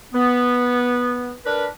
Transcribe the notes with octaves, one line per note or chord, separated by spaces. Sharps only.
B3
D4 A#4 B4